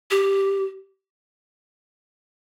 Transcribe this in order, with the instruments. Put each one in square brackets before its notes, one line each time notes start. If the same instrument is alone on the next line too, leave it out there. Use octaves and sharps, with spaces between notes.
[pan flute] G4